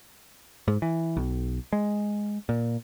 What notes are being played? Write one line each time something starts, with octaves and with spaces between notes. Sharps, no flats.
G#2
E3
B1
G#3
A#2